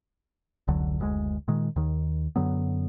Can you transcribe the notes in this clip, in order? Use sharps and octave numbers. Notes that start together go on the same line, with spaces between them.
F1 C#2 D3 F#3
F#1 D2 C#3 G#3
A#2 D#3 G#3
D#2 D#3
F#2 D3 F#3 B3